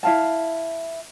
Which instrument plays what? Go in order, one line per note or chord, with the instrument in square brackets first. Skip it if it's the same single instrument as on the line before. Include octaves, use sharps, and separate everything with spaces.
[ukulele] E4 F5 A5